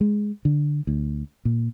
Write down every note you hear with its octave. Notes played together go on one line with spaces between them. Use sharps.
G#3
D3
D2
A#2